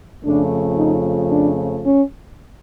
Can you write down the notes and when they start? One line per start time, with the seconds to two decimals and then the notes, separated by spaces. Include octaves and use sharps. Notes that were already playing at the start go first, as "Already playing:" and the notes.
0.24 F2 C#3 F3 A3 D4
0.77 D#4
1.31 D4
1.85 C#4